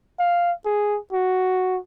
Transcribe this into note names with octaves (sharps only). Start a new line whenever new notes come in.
F5
G#4
F#4